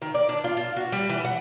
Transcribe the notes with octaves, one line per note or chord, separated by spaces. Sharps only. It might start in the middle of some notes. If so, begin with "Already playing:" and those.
D#3
D5
D4
F4
F4
F#4
G3
E3
F#5